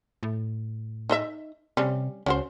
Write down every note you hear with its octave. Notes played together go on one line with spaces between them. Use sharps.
A2
D#4 D#5 E5
C3 G3 C#4
C#2 C#4 F#4 C5